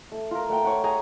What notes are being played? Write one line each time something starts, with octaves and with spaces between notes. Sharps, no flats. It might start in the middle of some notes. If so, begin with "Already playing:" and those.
A3
F4 A#4
A3 F#5 G5
C#5 F#5
G#4 G#5 A#5